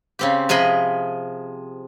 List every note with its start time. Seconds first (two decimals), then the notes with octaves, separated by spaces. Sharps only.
0.19 C#3 C4 G4
0.49 C3 F3 G#4 D#5 B5